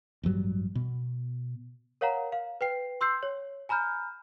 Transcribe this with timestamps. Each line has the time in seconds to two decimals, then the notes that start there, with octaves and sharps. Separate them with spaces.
0.23 A1 G2 F#3 G3
0.75 B2
2.01 A#4 C#5 F5 F#5 A#5
2.32 F5
2.61 B4 G5 C7
3.01 C6 E6 G6 C7
3.23 C#5
3.69 G#5 A#5 B5 F6 G6